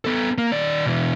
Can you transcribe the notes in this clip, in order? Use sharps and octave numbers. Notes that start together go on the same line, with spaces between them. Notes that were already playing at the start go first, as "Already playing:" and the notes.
B3 A4
A#3
D#3 D5
B2 E3